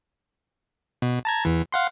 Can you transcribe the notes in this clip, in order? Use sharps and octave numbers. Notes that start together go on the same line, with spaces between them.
B2
A5 A#5 G#6
E2 E3
F5 F#5 C6